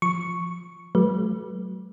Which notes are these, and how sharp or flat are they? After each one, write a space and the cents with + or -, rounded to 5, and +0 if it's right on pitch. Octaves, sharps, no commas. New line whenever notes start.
F3 +0 C#6 +0
F#3 +15 A3 -35 B4 -30